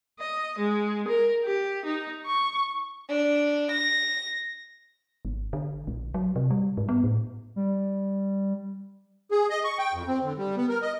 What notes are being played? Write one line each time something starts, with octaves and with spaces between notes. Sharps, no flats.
D#5
G#3
A#4
G4
D#4
C#6
D4
A#6
G#1
D3
A#1
F#3
C3
G3
G#2
B3
A2
G3
G#4
D#5
C#6
G5
F2
C4
D3
G3
B3
A#4
D#5